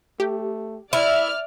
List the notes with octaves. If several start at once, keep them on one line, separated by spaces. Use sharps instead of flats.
A3 G4
E4 D5 E5 F6